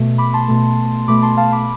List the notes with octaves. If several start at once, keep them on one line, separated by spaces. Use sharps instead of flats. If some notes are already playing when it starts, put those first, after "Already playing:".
Already playing: B2 A3
B5 D6
A5 C6
B2 A3
B2 A3 B5 D6
A5 C6
F5 A5
B5 D6